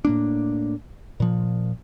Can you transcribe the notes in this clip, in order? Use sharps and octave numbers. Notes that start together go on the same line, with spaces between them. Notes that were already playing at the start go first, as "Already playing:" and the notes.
A2 A#3 D4
A#2 F3